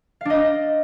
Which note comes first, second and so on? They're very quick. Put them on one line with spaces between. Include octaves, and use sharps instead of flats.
F5 D4 D#5